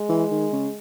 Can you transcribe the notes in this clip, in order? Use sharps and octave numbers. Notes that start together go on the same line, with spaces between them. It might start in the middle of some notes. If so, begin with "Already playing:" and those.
Already playing: G#3
E3
D#3
C#3